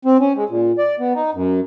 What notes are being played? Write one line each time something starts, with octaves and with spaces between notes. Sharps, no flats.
C4
C#4
G#3
A#2
D5
B3
D#4
F#2